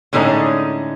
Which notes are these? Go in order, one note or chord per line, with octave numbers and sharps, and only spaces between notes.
A2 D3 G#3 C#4 D#4